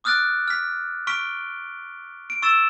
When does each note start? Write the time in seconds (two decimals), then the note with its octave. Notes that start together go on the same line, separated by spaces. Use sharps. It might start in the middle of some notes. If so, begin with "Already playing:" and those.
0.04 D6 D#6 F6 F#6 A6 D7
0.48 F6 B6
1.07 C#6 F6 B6 D7 G7
2.30 D7
2.42 C#6 E6 A6 E7